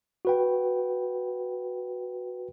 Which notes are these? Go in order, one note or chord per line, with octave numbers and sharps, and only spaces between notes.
F#4 B4 G5